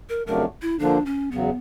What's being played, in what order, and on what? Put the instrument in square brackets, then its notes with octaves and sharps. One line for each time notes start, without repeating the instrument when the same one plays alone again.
[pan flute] A#4
[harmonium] F2 C#3 F#3 A3 D4 [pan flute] A#4
[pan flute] E4
[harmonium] D3 F3 A#3 [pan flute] D4
[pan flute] C#4
[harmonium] E2 C#3 F#3 [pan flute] B3